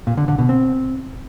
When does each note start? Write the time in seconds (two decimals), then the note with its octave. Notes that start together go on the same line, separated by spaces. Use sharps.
0.07 A#2
0.17 D3
0.28 D3
0.39 B2
0.49 C4